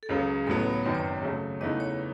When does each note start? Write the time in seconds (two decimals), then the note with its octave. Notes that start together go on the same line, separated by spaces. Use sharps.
0.03 A4
0.09 C#2 C#3 F#3 G#4
0.47 A1 A2 F#3 B3 A4
0.59 C#5
0.73 C#5
0.83 G#1 F#2 D#3 B4
0.95 C#5
1.23 C#3 F#3 A3
1.61 E2 C#3 E3 A3 D#4 D#5
1.80 C#5